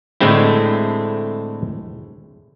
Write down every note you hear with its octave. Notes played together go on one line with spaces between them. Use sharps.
A2 D3 G#3 A3 C4 E4